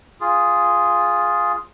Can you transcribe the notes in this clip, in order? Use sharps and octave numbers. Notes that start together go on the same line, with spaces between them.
F4 G#4